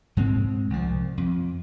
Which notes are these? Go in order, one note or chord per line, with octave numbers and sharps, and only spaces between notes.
G#2 G#3 C4
C2 F3
F2